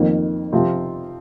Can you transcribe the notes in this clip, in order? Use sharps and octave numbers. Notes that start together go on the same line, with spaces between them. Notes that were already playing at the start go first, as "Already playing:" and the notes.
Already playing: F2 D#3 A#3
C3 F3 C4 F4